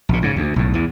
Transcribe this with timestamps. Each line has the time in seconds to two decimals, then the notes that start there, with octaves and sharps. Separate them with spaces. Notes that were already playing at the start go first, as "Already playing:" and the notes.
0.09 A#1 A#2
0.22 G#2 C#3
0.36 D2
0.56 B1 A2
0.74 E2 E3